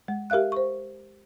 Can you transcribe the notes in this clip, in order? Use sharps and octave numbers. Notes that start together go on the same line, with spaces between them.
G#3
G4 A#4 E5 F5 F#6
C5 C#6